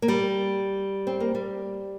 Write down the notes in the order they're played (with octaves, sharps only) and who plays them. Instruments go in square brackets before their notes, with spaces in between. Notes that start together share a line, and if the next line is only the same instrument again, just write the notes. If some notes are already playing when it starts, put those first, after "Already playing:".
[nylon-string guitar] A#3
G3
C4
A#3
G3